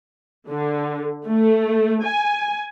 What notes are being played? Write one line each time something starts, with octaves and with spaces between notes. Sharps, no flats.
D3
A3
G#5